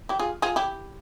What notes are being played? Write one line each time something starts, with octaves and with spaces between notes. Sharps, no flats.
E4 G4
F4 G#4
F4 G#4
E4 G4